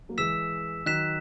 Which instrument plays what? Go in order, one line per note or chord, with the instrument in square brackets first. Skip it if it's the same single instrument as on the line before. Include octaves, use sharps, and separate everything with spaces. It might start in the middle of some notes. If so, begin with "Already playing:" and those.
[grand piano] F#3 A#3
[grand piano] E3 G#3 [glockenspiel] E6 B6 E7
[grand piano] D#3 F#3 [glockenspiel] F#6 B6 E7